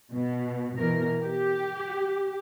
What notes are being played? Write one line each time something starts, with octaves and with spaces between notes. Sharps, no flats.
B2
B2 E3 A#4
G4